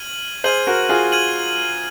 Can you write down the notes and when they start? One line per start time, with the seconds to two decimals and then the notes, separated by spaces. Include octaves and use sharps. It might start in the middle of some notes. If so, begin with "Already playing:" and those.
Already playing: F6 G#6 D#7 F#7
0.44 G#4 C5 F6 G#6 D#7 F#7
0.67 F#4 A#4
0.89 F4 G#4
1.12 F6 G#6 D#7 F#7